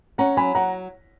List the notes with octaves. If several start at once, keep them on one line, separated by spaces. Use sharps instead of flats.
C#4 F#5 A#5
F#3 G#5 B5
F#3 F#5 A#5